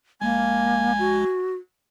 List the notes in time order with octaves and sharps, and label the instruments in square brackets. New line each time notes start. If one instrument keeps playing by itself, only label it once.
[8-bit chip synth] A#1 G#3 [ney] A#3 [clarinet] G#5
[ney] F#4